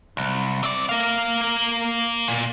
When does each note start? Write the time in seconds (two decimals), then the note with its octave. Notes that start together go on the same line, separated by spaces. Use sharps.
0.17 C2
0.63 C4 D5
0.89 A#3 F5
2.28 A#2